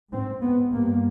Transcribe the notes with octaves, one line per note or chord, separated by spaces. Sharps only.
G#2 C4
B3
G2 A#3